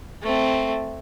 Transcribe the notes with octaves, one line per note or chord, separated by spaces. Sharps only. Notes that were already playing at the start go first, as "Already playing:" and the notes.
A3 C4